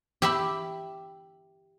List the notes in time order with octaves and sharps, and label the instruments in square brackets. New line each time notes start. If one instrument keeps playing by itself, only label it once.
[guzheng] G4 E5 B5